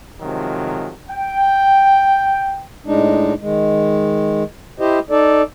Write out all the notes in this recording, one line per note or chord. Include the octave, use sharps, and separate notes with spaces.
C3 D#3 F3 F#3 G#3
G5
A2 G#3 D4 D#4
D#3 G#3
E4 G4 C5 D#5
D#4 A4 D5